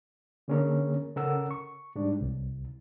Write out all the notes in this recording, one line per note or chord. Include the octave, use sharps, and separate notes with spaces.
D3 A#3 C#4 G#4 A#4 C#5
C#3 C#4 A4 A#4 F#5 E6
C#6
G#2 G3 D4
C2